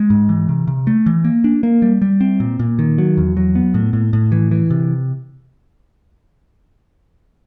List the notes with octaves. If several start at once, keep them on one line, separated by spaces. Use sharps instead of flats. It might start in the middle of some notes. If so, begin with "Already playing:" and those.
Already playing: G#3
G#2
E3
C3
C3
A3
E3
A#3
D4
A#3
G3
G3
C4
A#2
A#2
D#3
F#3
E2
F#3
B3
A2
A2
A2
E3
E3
C3